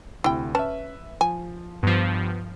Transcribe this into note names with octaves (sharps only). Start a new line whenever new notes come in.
D2 C3 E4 G5
C#4 B4 E5 A5
F3 G#5
G2 F3 B3